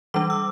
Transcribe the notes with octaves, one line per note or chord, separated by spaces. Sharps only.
E3 G3 D4 D6
E6